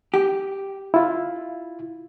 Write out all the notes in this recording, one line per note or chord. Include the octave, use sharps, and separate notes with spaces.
G4
E4 F4